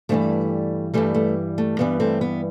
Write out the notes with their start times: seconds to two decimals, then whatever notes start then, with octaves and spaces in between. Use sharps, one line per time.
0.09 G2 E3 G3 A3 C4
0.94 G2 E3 G3 A3
1.14 A3
1.58 A3
1.79 G2 E3 G3 B3
2.00 A3 C4
2.21 B3